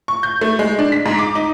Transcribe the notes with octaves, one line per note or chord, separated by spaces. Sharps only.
C#6
G6
A3
G#3
D4
B6
G#2
D6
D#4